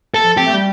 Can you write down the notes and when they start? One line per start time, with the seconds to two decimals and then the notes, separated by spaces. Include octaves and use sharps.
0.14 A4
0.22 F3
0.37 C4 G4
0.46 A3
0.53 G3